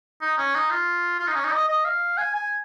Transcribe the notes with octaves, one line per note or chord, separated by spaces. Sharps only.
D#4
C#4
D#4
F4
F4
D#4
C#4
D#4
D#5
D#5
F5
G#5
G#5